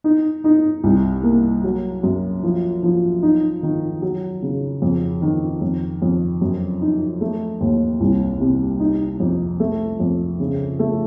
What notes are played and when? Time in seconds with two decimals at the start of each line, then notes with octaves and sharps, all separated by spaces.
0.04 D#4
0.44 D#4
0.84 C2
1.23 A#3
1.64 F#3
2.03 F#2
2.43 F3
2.83 F3
3.23 D#4
3.63 D#3
4.02 F#3
4.42 C#3
4.82 F2
5.22 D#3
5.62 F2
6.02 F2
6.41 F#2
6.82 D#4
7.21 A3
7.61 D#2
8.00 C2
8.40 C3
8.80 D#4
9.20 F2
9.60 A3
10.00 F2
10.40 C#3
10.79 A3